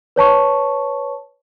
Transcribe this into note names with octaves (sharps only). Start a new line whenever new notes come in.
B4 C#5 A5 C#6